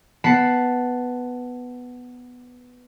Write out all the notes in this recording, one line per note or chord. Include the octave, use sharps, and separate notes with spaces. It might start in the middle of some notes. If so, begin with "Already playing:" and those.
B3 A5 B5 C7 C#7